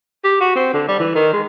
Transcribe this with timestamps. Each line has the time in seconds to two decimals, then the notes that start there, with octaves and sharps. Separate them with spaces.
0.24 G4
0.40 F#4
0.55 C4
0.73 D3
0.88 G3
0.99 E3
1.15 D#3
1.33 G#3